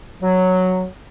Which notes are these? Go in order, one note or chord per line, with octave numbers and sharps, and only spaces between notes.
F#3